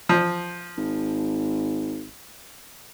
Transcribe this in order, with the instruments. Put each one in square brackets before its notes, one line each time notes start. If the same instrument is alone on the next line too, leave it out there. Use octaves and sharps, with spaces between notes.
[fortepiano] F3
[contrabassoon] G#1